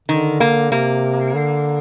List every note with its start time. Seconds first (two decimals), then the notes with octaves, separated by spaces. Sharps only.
0.08 D3 D#3
0.40 A#3
0.71 C3 A#3
1.34 D3